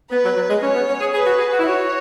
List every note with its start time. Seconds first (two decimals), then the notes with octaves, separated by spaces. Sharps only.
0.11 B3 B4
0.24 F#3
0.36 F#3
0.49 G#3
0.62 C#4 C#5
0.74 B3
0.87 C#4
1.01 G#4
1.13 G#4 B4
1.26 F#4
1.38 G#4
1.52 F#4
1.59 E4
1.64 F#4 C#5